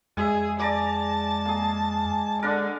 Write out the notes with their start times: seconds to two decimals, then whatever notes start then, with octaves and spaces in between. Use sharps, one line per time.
0.17 F2 G#3 G#4 E5 G#5
0.60 D5 A5 A#5 D6
1.45 A#3 G#4
2.43 D3 D4 A#4